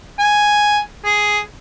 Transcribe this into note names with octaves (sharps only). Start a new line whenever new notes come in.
G#5
G#4